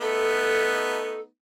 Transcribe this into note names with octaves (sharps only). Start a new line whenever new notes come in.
A3 B3 D#4 A4